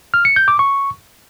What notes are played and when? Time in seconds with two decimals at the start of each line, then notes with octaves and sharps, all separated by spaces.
0.14 F6
0.25 C#7
0.36 G6
0.48 D6
0.59 C#6